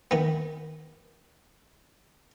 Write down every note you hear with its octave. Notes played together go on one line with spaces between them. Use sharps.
D#3 B3